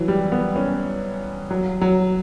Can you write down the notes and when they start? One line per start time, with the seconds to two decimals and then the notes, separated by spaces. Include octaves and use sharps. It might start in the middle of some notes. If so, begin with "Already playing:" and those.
Already playing: E3 F#3
0.08 G3
0.32 B3
0.56 C#4
1.51 F#3
1.81 F#3